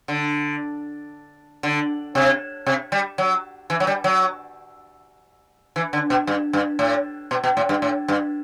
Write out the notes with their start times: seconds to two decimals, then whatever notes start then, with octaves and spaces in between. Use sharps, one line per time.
0.08 D3
1.63 D3
2.15 C3
2.66 C3
2.92 G3
3.18 F#3
3.70 E3
3.80 F#3
3.87 G3
4.04 F#3
5.76 E3
5.93 D3
6.10 B2
6.27 G2
6.53 G2
6.79 A2
7.31 B2
7.44 B2
7.57 A2
7.69 G2
7.82 A2
8.08 G2